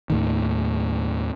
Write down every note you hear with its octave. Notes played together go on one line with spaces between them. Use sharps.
D#2 A2 D#3